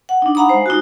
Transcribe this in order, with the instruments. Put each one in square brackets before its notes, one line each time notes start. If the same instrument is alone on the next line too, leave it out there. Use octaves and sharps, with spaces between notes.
[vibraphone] F#5
D4 D#4
F5 F#5 A#5 B5 D#6
G#3 C5
D#4 F4 F#4